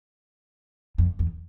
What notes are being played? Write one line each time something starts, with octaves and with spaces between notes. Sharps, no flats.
F2
E2